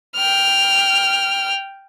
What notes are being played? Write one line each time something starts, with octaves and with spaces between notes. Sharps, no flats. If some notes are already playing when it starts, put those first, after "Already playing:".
G5 F6